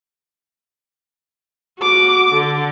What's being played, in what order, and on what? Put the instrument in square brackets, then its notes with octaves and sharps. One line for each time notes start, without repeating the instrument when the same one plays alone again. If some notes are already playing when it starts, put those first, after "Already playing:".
[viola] F#4 D6
D3